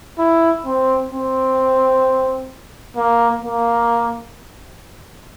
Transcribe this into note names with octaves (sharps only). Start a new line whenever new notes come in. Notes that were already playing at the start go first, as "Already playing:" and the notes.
E4
C4
C4
A#3
A#3